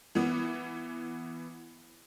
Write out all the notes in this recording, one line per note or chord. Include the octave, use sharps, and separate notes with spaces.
E3 B3